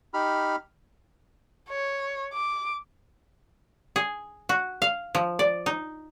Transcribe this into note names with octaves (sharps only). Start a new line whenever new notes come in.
D#4 G4 B5 F6
C#5
D6
G#4
F#4
F5
F3
D5
D#4